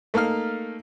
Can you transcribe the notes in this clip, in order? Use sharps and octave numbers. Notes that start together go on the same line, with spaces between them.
A3 A#3 D#4 F5 F6